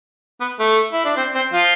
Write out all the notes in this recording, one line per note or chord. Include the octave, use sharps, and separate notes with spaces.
B3
A3
E4
D4
C4
C4
F3 F4